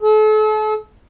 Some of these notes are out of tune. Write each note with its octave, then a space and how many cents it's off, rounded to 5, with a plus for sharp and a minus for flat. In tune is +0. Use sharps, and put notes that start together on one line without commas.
A4 -40